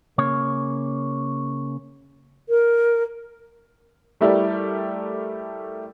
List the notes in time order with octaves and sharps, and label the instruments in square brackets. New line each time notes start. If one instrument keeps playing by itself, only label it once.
[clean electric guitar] C#3 A#3 C#5
[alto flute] A#4
[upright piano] G3 A3 E4 G4 A#4 D5